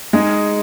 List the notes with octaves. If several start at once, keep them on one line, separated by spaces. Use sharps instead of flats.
G#3 D#4 G#4